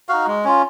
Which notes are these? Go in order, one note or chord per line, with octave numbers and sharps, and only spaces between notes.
D#4 F#4 F5
G#3
C#4 F4